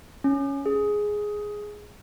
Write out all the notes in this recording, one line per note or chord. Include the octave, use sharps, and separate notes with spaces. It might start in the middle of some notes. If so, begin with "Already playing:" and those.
C#4
G#4